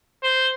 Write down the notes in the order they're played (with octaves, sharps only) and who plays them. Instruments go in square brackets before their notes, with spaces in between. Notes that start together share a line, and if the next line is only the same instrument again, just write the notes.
[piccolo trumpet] C5